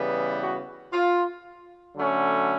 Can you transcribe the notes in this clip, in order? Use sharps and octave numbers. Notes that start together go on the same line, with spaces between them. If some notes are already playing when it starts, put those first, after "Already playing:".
Already playing: C#3 E3 G3 B3
F#4
F4
D3 F#3 A3 C#4